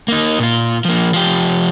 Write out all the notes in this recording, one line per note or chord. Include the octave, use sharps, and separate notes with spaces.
A#3 D#4
A#2 F4
F3 A#3
F3 G4